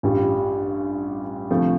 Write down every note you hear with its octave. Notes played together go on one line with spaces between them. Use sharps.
A1 G2 G3 F4
D2 C3 F3 A3